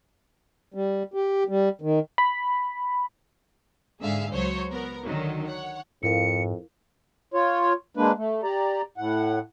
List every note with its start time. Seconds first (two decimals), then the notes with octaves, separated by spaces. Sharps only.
0.74 G3
1.14 G4
1.48 G3
1.81 D#3
2.18 B5
4.00 G#2 D3 G#4 E5 F5
4.32 C#2 F#3 C5 C#5
4.72 B3 A#4
5.05 D3 D#3 F#3
5.46 C#5 F#5
6.03 F2 G#2 E4 A#4 F5 C#7
7.34 F4 C#5
7.97 G#3 A#3 D4 B4
8.18 A3
8.43 G4 D5 A#5
8.98 A2 F#5